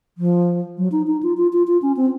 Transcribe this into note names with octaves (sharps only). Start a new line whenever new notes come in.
F3
F#3
D#4
D#4
F4
F4
F4
F4
C#4
C4